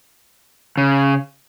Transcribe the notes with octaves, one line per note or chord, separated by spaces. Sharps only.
C#3